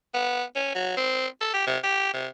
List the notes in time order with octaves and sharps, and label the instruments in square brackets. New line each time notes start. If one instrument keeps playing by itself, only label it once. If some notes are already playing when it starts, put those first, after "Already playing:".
[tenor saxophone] B3
C#4
F#3
C4
A4
G4
C3
G4
C3